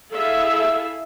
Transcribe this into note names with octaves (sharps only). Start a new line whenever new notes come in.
E4 G#4 A4 E5 F5